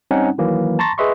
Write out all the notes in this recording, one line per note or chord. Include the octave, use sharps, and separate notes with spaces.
G3 C4 C#4 D#4 F#5
D#3 E3 F#3 A#3
A5 A#5 C6 C#6 A6 A#6
G#4 B4 D#5 E5 C6 C#6